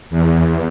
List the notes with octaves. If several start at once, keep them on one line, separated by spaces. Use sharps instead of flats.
E2